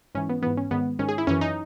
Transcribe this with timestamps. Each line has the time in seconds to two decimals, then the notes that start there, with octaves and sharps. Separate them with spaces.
0.15 G#2 E3 C#4
0.29 B3
0.42 G#2 E3 B3
0.57 C#4
0.71 G#2 D#3 B3
0.99 G#2 D#3 C#4
1.08 G#4
1.18 E4
1.27 F#2 E3 C#4
1.41 D#4